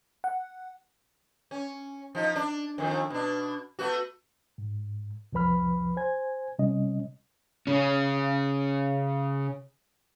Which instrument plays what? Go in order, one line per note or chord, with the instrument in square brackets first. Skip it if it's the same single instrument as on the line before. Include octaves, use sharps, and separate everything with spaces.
[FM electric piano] F#5
[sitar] C#4
F3 D#4
D4
F2 D#3
B2 D4
A3 B3 F#4
[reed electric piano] G#2
C2 F2 F3 B4 B5 F6
C5 G#5 G#6
C3 G3 C#4 D#5
[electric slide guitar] C#3 C#4